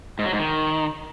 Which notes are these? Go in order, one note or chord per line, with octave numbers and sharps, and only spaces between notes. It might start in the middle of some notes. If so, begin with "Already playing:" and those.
G#2
F#3
G#2
D#3